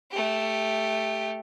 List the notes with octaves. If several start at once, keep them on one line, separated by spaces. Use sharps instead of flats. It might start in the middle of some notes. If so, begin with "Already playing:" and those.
A3 G4